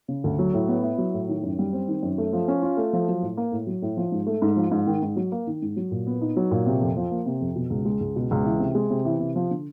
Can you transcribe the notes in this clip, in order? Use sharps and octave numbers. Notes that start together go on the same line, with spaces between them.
C#3
D2
F#3
A2
B3
E4
F#3
A2
D#3
F#2
G3
C4
D#3
F#2
A3
F3
C#4
F4
A3
F3
F#3
A2
A#3
A2
F#3
A2
F3
G#2
A3
G#2
F3
G#2
D#3
G#2
F#3
A#3
D#3
G#2
F#3
A#2
B3
D#4
F#3
A#2
C3
F2
F3
A#3
C3
F2
B2
C#2
G#3
C#2
B2
C#2
E3
C3
G#3
C3
E3
C3
F3
D3